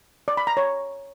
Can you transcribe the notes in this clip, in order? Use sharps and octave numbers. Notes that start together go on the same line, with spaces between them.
D5
B5
A#5
C#5